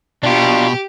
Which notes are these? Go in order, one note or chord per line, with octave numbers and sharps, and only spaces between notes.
B2 D4 F4 G4